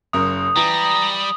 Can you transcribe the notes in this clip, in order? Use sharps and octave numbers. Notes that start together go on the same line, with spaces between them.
F#1 F#2 A#4 D#6
E3 G3 A#5